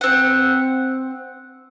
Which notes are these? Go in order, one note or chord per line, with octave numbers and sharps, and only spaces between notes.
C4 F#5